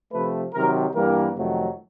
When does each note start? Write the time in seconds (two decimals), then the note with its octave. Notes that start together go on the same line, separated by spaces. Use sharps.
0.12 C3 F3 A3 B4
0.53 C3 D#3 F#3 A#4
0.94 G2 E3 G3 A#3 A#4
1.36 F2 C3 D#3 F#3 A3